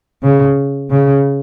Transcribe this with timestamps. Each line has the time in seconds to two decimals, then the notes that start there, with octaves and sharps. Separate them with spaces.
0.23 C#3
0.90 C#3